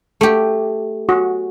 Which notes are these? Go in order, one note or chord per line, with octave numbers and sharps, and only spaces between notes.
A3 G4
F#4